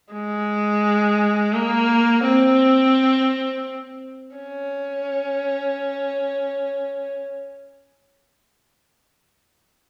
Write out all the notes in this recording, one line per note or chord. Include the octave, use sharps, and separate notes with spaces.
G#3
A#3
C4
C#4